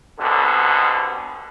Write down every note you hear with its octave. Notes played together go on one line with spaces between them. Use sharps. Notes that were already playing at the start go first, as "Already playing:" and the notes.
C2 B2 D3